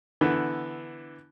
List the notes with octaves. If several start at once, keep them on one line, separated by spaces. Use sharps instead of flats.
D3 E3 B3